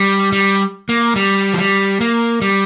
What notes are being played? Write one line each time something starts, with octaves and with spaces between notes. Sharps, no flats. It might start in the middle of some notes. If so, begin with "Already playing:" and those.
Already playing: G3
G3
A#3
G3
F3
G3
A#3
G3